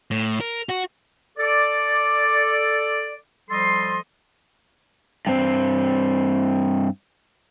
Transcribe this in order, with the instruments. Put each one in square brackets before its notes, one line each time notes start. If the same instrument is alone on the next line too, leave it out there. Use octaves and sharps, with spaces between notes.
[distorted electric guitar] A2
A#4
F#4
[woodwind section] A4 D5
F3 G3 A4 D#5 C6
[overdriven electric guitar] G2 C4